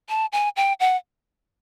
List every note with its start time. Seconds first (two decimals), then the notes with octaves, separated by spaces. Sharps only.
0.09 A5
0.32 G#5
0.57 G5
0.80 F#5